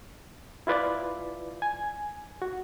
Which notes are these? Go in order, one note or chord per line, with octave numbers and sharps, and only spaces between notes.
E4 F4 B4 D5
G#5
F#4